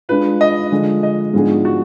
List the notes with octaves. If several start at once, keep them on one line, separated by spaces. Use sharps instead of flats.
G#3 D4 F4 B4
D#5
D3 F3 G#3
D#5
G#2 F3 B3 D4 G#4
F#4